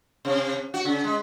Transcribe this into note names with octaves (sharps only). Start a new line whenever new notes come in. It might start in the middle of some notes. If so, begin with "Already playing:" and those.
C3
F#4
C#3
G#3